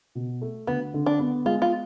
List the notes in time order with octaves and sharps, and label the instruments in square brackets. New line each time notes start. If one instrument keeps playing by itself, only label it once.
[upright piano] B2
A3
[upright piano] D2 [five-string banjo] B3
[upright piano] D3
[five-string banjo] D4
[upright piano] B3
[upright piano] G#3 [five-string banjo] F4
[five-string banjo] F4